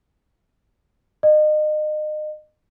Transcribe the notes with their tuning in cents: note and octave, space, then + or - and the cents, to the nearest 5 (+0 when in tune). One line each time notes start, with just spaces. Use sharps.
D#5 -30